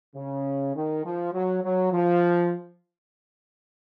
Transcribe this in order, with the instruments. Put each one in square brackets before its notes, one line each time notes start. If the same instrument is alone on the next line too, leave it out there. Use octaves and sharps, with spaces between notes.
[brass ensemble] C#3
D#3
F3
F#3
F#3
F3